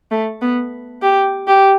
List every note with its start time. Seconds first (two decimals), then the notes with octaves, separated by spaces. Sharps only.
0.11 A3
0.42 B3
1.02 G4
1.47 G4